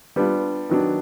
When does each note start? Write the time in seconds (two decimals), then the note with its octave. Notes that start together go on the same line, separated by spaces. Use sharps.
0.16 G3 B3 D4 F4
0.70 D#3 F#3 B3 D4